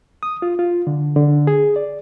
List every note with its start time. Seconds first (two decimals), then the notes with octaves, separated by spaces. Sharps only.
0.23 D#6
0.42 F4
0.59 F4
0.87 D3
1.16 D3
1.47 G#4
1.76 D5